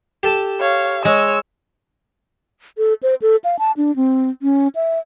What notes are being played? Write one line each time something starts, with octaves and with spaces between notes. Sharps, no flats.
G4 A4 A5
C#5 F5
G#3 C#5 E6
A4
C5
A4
F5
A5
D4
C4
C#4
E5